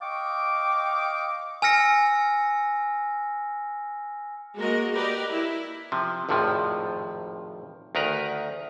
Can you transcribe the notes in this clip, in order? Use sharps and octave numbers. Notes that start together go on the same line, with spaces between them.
D#5 F5 G5 C#6 D6
G#5 E6 F6 A#6 C#7
G#3 A#3 F#4 A#4 D#5
G4 A#4 B4 D5 D#5
E4
C3 F3
G#1 F2 A2 C3 F3
D2 D#3 A#4 B4 A#5